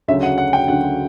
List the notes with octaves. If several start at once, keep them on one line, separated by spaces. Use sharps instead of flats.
D2 C#3 F#3 E5
F#5
F#5
G5
D2 C#3 F#3 F#5